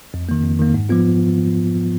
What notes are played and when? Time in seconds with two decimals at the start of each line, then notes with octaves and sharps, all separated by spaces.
0.14 F2
0.29 D#3 A#3
0.44 F2
0.59 D#3 A#3
0.74 G#2
0.89 F3 B3 F4